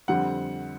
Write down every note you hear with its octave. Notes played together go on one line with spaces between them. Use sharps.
F2 D3 G3 C4 F#5